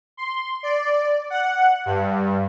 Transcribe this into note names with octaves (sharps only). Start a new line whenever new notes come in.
C6
D5
F#5
G2